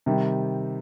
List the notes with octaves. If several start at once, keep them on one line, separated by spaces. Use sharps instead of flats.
C3 D#3 G3